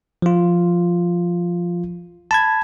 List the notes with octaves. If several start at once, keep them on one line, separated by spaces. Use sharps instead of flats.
F3 F4
A5 B5 G#6